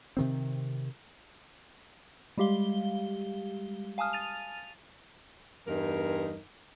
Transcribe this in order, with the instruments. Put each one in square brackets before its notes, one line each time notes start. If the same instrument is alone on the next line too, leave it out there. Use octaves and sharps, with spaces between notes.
[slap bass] C3 D#3 C4
[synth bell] G3 G#3 G4 F5 G7
F5 G#5 A5 D#6 F6
A6 D#7 F7
[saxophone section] E2 G2 D#4 A#4